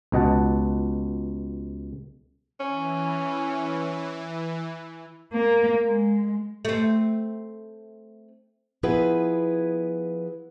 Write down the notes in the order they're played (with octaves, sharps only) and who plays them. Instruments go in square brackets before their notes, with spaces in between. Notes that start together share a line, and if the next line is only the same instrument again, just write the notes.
[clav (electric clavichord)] C#2 B2 D#5 F#5 A5
[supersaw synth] E3 [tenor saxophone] C#4
[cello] A#3
G#3
[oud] A3 C4
[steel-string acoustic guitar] F3 B3 E4 G#4 B4